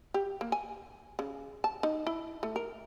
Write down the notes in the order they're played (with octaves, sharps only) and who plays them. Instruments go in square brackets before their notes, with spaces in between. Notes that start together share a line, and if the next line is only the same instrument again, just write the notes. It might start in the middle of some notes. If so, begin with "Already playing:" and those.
[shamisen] G4
A#3
G#5
C#3
A5
D#4
E4
A3
A#4